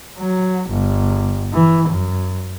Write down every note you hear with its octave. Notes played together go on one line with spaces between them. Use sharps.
F#3
G1
E3
F#2